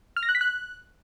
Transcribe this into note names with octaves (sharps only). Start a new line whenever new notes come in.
F6
A#6
F#6
B6
F#6